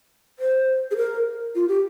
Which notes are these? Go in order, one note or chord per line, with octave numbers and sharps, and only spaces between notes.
C5
G#4
A#4
F4
G4